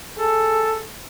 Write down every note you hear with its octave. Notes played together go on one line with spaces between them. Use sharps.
G#4 A4